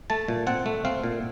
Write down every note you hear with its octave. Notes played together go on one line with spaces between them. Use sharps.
A3 A5
A#2
C4 F#5
A3
C4 F5
A#2